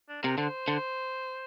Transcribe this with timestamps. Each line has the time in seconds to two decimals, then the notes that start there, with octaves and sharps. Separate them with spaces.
0.09 D4
0.23 C3 A#4
0.38 D3 C5
0.68 D3